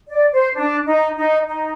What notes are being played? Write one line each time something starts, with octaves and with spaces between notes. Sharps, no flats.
D5
C5
D4
D#4
D#4
D#4